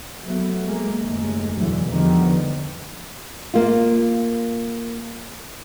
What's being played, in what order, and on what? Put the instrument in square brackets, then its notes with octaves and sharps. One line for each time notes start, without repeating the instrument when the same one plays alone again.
[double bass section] F#3 A3 B3
G#3 A#3
F#1 D#2 G#3 A3
E2 B2 D3 E3 F#3
E2 D3 D#3 F3 G3 B3
[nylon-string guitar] A#3 F4